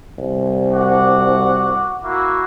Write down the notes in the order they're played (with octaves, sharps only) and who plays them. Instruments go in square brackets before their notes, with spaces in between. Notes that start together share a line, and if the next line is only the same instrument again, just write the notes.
[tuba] C2
[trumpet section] F#4 F#5 D6
A#3 E4 F#4